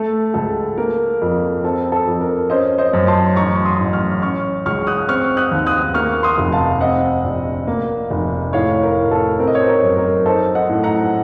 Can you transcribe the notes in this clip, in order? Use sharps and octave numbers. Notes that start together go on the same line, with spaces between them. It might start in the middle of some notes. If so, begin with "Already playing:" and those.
Already playing: A3 A4
C#2 A4
A#3 A#4
F2
C4 A4
A4
F2
A#4
C#4 C5 D#5
C5 D#5
F#2
A5 C6
A1 A#5 C#6
C6 D#6
A1
C#6 F6
C#4 C#6 F6
C#2 C#6 F6
D#6 F#6
C4 C#6 F6
D#6 F#6
D#2
D#6 F#6
A#3 C#6 F6
C6 D#6
F1
F5 A5
C4 D#5 F#5
A#1
A#3
F1
A2 C#5 F5
A#4
A2
A4
C4 A#4
D#5
C#5
C5
A#4
F#2
A#4
D#4 A4 C5
D#5 F#5
A2
F#5 A#5